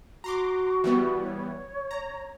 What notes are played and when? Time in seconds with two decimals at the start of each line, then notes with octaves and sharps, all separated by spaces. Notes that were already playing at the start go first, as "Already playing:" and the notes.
0.24 F#4 A#5 C6 D6
0.84 E3 G3 B3
1.24 C#5
1.91 A#5